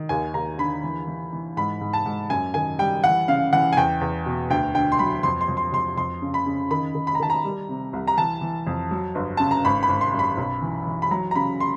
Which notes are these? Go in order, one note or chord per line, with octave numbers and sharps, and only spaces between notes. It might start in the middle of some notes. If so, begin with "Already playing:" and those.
Already playing: D#3
D#2 G#5
D#2 A#5
D3 B5
E3
E3
E3
G#2 B5
G#2
A5
G#2
F#2 G#5
D#3 G#5
G3 G5
E3 F#5
C#3 F5
E3 F#5
G#5
E2 G5
E2
B2
D2 G5
D3 G5
C6
F#3 B5
F2 C6
C6
F2
C6
F2 C6
F2 C6
C#3
B5
C#3
D#3 B5
D#3
B5
A#5
D#3 A5
A#5
G3
C3
C2
A#5
E3 A5
E3
F2
F#3
G1
C#3 A5
A#5
G#1 B5
B5
G#1
C6
F#2
B5
B1
E3
E3
B5
F#3 A#5
A#5
C#3 B5
C6